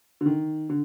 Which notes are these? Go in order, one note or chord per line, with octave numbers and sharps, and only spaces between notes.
D3
D#3
D3